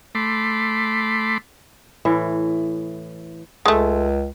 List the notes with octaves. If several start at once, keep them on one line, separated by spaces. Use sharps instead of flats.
A3 B5 C6 D6
A2 E3
C#2 G#3 A3